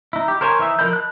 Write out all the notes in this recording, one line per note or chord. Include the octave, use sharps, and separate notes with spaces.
D#4 E4
G4
A#4 C5 C#5 D#5 G#5
E3 D#4 E5
F3 A#4 D#5 B5 G6
A5 F#6